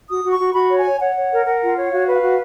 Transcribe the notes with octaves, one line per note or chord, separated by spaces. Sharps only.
F#4 D#6
F#4
C#6
F#4
F#4 B5
C#5
G#5
C#5
C#5 F#5
C#5
A#4
A#4
F4
C#5
F#4 F5
B4
F5
F#4